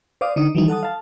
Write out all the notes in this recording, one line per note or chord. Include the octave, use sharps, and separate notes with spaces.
C5 D5 F5 D6 D#6
D3 D#4 D#6
D#3 E3 F#3 G3 D#4
A4 F#5 A5 D#6
F5 A5